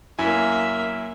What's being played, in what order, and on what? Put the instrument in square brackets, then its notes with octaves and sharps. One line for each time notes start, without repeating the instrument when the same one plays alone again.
[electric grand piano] F#2 E4 G#5 [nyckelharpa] A#3 E5